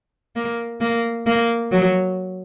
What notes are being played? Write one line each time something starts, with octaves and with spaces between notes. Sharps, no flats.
A#3
A#3
A#3
F#3